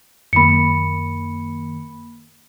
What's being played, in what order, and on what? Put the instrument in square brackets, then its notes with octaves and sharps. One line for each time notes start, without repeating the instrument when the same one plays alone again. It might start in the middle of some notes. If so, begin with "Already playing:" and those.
[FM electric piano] F#2 D#3 A#3 [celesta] B5 C#7